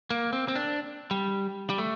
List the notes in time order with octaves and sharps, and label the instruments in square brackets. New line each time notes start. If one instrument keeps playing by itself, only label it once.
[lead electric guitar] A#3
C4
C4
D4
G3
G3
A3